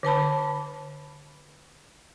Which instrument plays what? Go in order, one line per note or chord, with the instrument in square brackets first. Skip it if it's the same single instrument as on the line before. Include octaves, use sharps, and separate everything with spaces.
[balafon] D3 B4 A5 B5